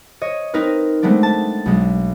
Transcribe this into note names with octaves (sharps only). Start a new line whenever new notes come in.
C#5 D#5
C4 D#4 A#4 B4
G#3 A3 B3 C4 D4
A5
B1 G#3